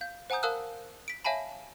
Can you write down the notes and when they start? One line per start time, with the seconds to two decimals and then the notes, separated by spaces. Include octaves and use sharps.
0.01 F5 G6
0.30 C5 F#5 G#5 A#5 D#6 G6
0.43 A#4 F5 A5 D#6 E6 F#6
1.08 B6 D7
1.24 C#5 E5 F5 G#5 A5 B5